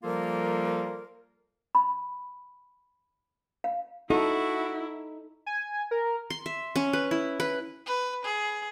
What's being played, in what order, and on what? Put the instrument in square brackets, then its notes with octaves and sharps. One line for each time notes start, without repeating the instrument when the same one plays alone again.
[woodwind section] F3 G3 A#3 F4 A4 A#4
[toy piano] B5
F5
[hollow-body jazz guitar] D#4 [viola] E4 [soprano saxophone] F#4 [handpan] A4
[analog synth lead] G#5
A#4
[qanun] C6
E5
C#4
B4
E4
B4
[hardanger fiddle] B4
G#4